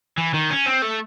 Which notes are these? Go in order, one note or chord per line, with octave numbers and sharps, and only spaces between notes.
E3
D#3
C#4
C4
A3